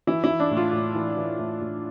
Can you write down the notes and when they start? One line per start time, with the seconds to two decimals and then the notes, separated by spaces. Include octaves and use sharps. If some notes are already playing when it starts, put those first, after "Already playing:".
0.07 E3 E4
0.24 E4
0.29 E3
0.40 D4
0.51 A2
0.57 F4
0.73 A2
0.95 E3
1.17 E3
1.39 A2
1.61 A2